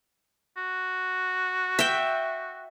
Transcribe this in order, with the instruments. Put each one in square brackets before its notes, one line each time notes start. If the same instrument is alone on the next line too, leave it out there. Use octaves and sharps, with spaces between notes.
[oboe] F#4
[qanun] E5 G5